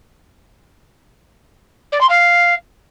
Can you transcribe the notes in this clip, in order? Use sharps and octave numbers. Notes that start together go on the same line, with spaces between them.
D5
C6
F5